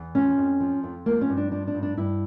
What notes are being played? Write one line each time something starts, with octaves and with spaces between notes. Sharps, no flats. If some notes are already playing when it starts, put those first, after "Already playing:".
Already playing: E2
F3 C#4
F2
F3
F2
F3 A#3
C#4
G2
D4
F3 D4
D4
G2
D4
G2 E4